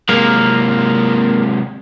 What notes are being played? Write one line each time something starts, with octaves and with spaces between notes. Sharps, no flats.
C3 G#3 A#3 A#4